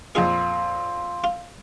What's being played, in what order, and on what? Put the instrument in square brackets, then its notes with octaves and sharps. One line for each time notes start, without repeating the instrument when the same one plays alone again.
[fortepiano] F2 A#2 [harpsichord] D#4 G#4 [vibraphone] F5 C6
[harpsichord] F4